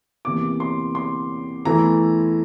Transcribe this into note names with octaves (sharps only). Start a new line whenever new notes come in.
E2 C3 E3 A#3 D6
C6
C6
E2 E3 A3 E4 A#5